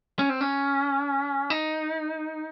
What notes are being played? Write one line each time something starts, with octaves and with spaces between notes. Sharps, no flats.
C#4
C4
C#4
D#4